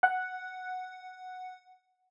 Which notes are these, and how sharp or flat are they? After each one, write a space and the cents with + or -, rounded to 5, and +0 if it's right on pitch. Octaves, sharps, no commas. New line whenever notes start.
F#5 +0